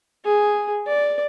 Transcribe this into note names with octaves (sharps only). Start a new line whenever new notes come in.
G#4
D5